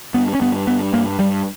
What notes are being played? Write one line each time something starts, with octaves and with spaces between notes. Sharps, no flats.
G2 B3
C#4
G2 B3
G2 B3
G2 A#3
G2 G3